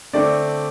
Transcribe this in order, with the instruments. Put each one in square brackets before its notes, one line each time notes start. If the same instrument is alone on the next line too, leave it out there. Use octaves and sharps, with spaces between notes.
[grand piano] D3 A3 C4 D5